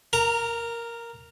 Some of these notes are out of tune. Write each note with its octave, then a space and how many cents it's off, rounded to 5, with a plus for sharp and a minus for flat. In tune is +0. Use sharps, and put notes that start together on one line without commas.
A#4 +0 A#5 -25